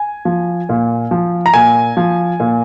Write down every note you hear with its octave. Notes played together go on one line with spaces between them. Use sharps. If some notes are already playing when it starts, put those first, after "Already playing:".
Already playing: G#5
F3
A#2
F3
A#5
A#2 G#5
F3
A#2